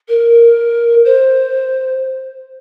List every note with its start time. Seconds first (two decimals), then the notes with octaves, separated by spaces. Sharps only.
0.08 A#4
1.05 C5